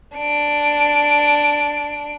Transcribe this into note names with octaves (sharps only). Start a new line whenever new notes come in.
D4 D7